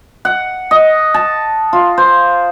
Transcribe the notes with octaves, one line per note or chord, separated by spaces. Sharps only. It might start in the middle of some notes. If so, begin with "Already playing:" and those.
F#5
D#5
A5
F4
C5